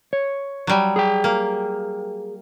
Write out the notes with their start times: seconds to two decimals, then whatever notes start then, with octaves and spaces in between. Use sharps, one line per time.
0.13 C#5
0.67 F#3 G3
0.96 G#4 G5
1.24 A#3